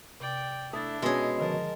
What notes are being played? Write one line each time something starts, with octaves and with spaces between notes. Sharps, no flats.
C3 D5 G5
A3 D4 E4 D#6 A6
B2 G#3 C#4 G#4
D3 D#3 F3 A#4 A5